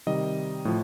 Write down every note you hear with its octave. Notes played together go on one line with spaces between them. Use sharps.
C3 D#3 G3 D#5
A2 F3